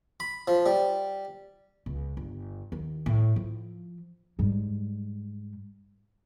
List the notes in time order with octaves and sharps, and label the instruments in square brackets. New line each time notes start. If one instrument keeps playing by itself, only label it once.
[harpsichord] B5
F3
G3
[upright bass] C#2
G1
D#2
A2
F3
G#2 G3